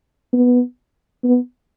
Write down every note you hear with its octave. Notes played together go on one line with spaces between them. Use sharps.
B3
B3